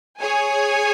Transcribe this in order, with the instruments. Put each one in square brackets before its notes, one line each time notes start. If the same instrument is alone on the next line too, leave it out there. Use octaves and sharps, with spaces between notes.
[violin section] G#4 C#5 G#5